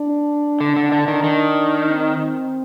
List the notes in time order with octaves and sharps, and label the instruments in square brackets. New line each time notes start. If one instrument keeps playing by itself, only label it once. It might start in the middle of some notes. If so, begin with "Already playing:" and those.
Already playing: [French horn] D4
[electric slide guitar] D3
D3
D3
D#3
D#3
[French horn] C4